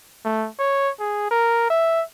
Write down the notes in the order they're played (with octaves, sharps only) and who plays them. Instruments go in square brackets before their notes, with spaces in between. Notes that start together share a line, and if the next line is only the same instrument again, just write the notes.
[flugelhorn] A3
C#5
G#4
A#4
E5